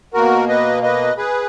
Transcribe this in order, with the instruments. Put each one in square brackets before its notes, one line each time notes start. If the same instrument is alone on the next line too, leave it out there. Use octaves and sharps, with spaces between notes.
[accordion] B2 A#3 F#4 A#4
B4 D#5
B4 D#5
G#4 B4